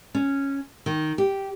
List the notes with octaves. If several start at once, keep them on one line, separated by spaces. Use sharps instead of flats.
C#4
D#3
G4